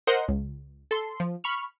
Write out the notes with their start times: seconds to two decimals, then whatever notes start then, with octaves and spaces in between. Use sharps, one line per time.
0.07 A#4 C5 D#5 F#5 C6
0.28 C#2
0.91 A4 C6
1.20 F3
1.44 B5 C#6 F6